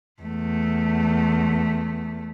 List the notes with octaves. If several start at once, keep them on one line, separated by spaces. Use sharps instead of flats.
E2 A3